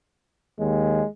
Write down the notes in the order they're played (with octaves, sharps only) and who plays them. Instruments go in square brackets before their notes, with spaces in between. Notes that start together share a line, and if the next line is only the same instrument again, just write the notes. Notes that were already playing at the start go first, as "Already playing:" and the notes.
[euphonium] D#2 [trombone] G#3